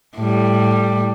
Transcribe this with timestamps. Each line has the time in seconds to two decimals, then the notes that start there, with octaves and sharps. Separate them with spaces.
0.18 A2 G3